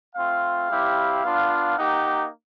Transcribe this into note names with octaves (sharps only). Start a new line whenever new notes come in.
A3 C4 F4 F5
G3 C4 E4 G4
B3 D4 F4
A#3 D#4 G4 F#5